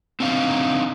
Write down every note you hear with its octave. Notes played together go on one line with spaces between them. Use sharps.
C4 D4 D#4 F5